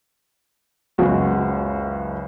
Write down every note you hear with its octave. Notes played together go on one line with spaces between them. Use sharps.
F#1 C#2 G#3 F#4